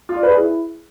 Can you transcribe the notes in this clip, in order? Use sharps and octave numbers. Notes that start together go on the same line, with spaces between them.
F4
D5
B4
G#4
E4